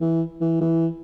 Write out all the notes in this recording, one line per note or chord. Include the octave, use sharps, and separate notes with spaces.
E3
E3
E3